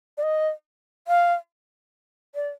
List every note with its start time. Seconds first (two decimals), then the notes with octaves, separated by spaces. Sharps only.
0.18 D5
0.23 D#5
1.08 F5
2.35 D5